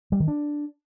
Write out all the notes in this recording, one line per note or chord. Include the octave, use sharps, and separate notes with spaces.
G3
D#3
D4